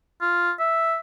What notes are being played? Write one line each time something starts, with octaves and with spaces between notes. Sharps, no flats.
F4
E5